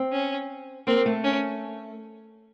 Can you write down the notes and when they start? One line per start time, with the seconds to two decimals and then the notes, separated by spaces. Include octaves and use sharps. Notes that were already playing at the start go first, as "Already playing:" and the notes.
Already playing: C4
0.12 C#4
0.87 A#3 C4
1.06 A3
1.24 C#4